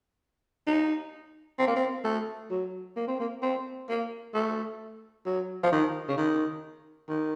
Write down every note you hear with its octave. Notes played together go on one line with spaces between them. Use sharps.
D#4
C4
A#3
C4
A3
F#3
A#3
C4
A#3
C4
A#3
A3
F#3
F3
D#3
C#3
D#3
D#3